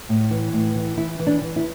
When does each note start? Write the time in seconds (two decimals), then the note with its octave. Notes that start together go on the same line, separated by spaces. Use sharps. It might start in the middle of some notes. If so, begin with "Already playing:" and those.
0.09 A2
0.31 E3
0.53 A2
0.75 E3
0.97 E3 E4
1.19 E3
1.26 D4
1.42 E3
1.56 E4